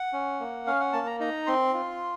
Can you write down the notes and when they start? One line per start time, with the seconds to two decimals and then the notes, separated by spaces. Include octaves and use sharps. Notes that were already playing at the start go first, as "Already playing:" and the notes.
Already playing: F#5
0.13 C#4
0.40 A#3
0.67 C#4 F5
0.80 F#5
0.93 A#3 A5
1.07 A#5
1.20 D#4 A#5
1.47 C4 C6
1.74 F4